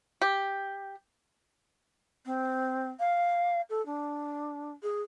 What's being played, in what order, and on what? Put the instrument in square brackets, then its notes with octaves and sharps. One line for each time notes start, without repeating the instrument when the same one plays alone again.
[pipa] G4
[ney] C4
F5
A4
D4
G#4